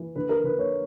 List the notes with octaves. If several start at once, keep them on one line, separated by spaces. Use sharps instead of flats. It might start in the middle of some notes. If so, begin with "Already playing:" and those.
Already playing: E3
D3 B4
A#4
D3 B4
C#5